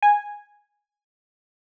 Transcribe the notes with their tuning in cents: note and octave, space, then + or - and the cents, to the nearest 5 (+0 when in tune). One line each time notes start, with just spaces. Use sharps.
G#5 -10